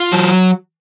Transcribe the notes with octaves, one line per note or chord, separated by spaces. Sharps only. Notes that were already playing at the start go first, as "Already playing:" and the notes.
Already playing: F4
F#3